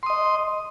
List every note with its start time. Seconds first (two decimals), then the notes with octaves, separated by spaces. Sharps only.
0.03 C6
0.06 D#6
0.10 D#5